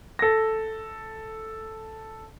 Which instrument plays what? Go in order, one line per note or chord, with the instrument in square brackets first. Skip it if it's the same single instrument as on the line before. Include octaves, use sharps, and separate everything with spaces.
[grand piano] A4 A#6